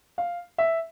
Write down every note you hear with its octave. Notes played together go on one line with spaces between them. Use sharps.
F5
E5